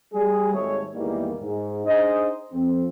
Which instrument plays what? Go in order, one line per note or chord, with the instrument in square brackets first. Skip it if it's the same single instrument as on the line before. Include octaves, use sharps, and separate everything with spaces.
[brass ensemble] G3 G#4
G#1 D#2 G#2 G3 A3 C#5
E2 G#2 D#3 E3 G3 A#3
G#2
D4 D#4 G#4 C5 D#5
F2 C4